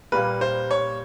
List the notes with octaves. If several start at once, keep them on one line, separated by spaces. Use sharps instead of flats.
A#2 G3 A#3 B4
C5
C#5